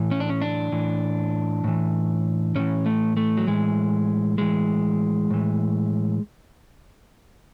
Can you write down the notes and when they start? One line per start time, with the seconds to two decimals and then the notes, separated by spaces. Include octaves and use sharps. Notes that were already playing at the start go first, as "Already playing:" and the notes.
Already playing: A2 E3
0.11 C#4
0.20 D4
0.29 C#4
0.42 D4
0.72 A2 E3
1.64 A2 E3
2.55 A2 E3 C#4
2.86 A3
3.17 A3
3.37 F#3
3.47 A2 E3 G#3
4.38 A2 E3 G#3
5.30 A2 E3